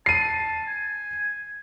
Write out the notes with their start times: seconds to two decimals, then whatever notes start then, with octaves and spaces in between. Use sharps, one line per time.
0.06 A5 C7 D#7
0.68 G#5